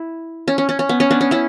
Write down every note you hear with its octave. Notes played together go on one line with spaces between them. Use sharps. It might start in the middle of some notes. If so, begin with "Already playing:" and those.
Already playing: E4
C#4
C#4
C#4
C#4
B3
C#4
B3 D4
C#4
C#4 E4